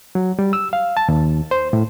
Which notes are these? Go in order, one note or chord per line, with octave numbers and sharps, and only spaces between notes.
F#3
G3
E6
F5
A5
D#2
C5
A2